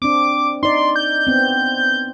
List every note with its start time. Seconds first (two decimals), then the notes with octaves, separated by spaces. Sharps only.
0.02 C4 D4 D6
0.63 D#4 D5 C6
0.96 G6
1.27 B3 C4